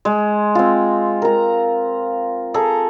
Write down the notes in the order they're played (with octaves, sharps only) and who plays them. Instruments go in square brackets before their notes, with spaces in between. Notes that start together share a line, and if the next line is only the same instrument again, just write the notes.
[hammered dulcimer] G#3
C4 F4
A#4 A#5
G#4 A4 A#5